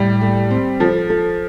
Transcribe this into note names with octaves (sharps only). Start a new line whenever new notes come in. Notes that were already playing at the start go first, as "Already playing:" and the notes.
Already playing: A2 G3
A3
C4
F3 A4
A4